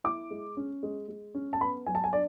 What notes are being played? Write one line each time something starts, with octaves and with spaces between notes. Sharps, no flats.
E4 D6
G#3
C#4
G#3
G#3
C#4
A5
B3 B5
F#3 G#5
A5
G#5
D4 D5